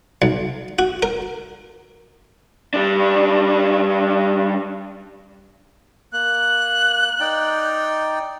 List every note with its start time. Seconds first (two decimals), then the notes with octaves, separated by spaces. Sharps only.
0.22 B1
0.79 F#4
1.03 A#4
2.74 G3 D4
6.13 A#3 F#6
7.20 D#4 D5 G5